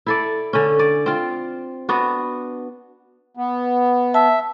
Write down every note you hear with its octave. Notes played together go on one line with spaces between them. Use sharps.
E4 A4 D5
D3 C#4
D5
C4 F4
B3 D4 F#4
B3
E5 A5